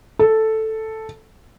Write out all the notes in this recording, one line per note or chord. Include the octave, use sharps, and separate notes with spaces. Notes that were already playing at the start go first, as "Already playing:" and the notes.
A4